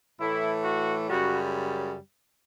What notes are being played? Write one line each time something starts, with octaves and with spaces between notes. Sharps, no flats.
A2 E3 A3 E4
F#4
F#2 C#3 G3 F#4